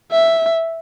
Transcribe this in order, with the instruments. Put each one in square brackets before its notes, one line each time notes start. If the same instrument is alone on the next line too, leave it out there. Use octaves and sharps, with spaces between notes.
[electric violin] E5